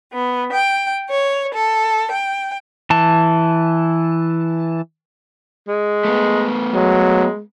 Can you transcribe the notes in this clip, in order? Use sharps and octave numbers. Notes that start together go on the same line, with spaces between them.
B3
G5
C#5
A4
G5
E3 A5
G#3
A3 B3
F#3 G#3